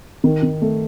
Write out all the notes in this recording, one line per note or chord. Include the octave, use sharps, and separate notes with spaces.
D#3
D#3
A3